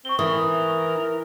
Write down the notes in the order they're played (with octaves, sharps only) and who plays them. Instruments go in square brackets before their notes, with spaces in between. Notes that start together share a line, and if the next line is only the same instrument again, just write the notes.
[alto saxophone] C4 [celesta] C#6 G7
[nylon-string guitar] E3 [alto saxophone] A#4 [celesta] D#6 G7